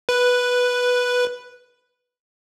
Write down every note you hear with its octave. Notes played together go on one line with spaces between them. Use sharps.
B4